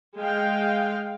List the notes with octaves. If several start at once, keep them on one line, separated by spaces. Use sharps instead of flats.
G#3 F5 G5